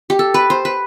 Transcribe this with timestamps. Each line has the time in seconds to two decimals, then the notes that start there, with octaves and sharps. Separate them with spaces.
0.10 G4
0.19 A4
0.34 B4
0.50 C5
0.65 B4